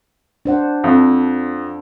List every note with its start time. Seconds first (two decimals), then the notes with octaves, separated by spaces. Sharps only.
0.45 D4 C5 F#5
0.84 F2